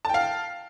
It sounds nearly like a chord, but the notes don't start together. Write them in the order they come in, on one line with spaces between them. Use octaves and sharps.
A5 G5 F5